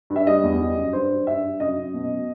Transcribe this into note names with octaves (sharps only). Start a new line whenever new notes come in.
G2
E5
G3 D#5
E2
G3
F#2
G2 C5
G2
G2 E5
G2
F#2 D#5
F#2
B2
B2